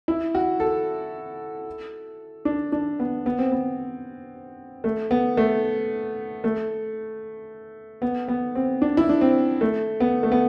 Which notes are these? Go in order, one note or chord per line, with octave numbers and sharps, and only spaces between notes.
E4
F#4
A4
D4
D4
B3
B3
C4
B3
A3
B3
A3
A3
B3
B3
C4
D4
E4
D4
C4
A3
B3
A3
B3